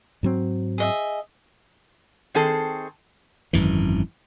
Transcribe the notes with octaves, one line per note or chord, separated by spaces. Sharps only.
G#2 F#3 C4
G#4 D#5 E5
D#3 C4 G#4 A4
G#1 F#2 E3